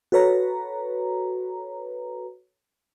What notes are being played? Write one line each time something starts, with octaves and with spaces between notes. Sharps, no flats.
F#4 A4 B4 C#5 A#5